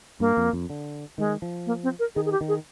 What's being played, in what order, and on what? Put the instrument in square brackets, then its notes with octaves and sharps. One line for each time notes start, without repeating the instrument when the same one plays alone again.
[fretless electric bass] G2 [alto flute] A#3
[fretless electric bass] F2
F2
D3
[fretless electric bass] D#3 [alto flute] G#3
[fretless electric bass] F3
[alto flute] A#3
C4
A#4
[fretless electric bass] D#3 [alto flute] G#4
[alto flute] G#4
G4
[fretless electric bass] D#3
[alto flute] G#4